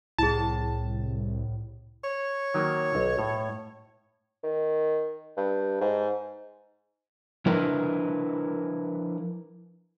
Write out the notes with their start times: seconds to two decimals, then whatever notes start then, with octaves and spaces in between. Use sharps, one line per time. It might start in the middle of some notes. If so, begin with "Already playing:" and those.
0.19 C2 A2 E4 G#4 A5
2.04 C#5
2.54 D#3 F#3 A#3
2.95 B1
3.19 A2
4.44 D#3
5.37 G2
5.81 G#2
7.46 F3 D4 E4 A#4 B4